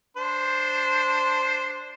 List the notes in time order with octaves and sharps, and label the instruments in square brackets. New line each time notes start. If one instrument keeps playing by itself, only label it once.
[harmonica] D4 C5